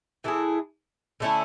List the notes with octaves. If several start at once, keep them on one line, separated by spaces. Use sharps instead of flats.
E3 A3 E4 G#4
D3 A3 C#4 E4